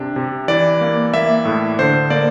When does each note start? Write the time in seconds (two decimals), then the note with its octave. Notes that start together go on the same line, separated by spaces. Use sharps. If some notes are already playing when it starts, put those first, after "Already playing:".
Already playing: C3 D4
0.16 C3
0.48 E3 D5
0.81 A#3
1.14 A#3 E5
1.45 A2
1.79 D3 C5
2.10 A#3 D5